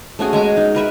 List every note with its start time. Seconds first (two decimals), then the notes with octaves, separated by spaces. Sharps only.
0.19 A3 C#4 F#4 G#4
0.33 G#3 G#5 A#5
0.57 D#4
0.75 A#4 B4 E5